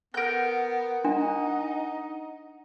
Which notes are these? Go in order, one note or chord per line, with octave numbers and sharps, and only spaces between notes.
B3 A#4 F#5 G6
D4 D#4